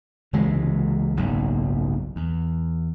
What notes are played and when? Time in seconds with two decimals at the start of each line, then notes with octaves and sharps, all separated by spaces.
0.33 C#2 C3 E3 G#3
1.17 F#1 B1 G#2
2.16 E2